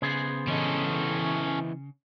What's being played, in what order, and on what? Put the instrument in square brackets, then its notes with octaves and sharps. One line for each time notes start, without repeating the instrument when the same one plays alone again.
[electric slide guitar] C#3 [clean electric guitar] B3 G#4 C5
[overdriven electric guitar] E3 D#5 [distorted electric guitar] C#4 A4